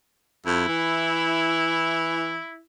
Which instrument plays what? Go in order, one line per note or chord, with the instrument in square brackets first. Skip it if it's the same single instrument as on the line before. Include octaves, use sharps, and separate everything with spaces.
[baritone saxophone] F2 [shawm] E4
[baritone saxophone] E3